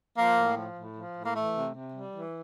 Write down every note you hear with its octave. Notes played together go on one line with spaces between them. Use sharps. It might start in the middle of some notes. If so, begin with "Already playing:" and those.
F3 A#3
A2
F3
A2
F3
A2
A#3
E3 A3
C3
C3
G3
E3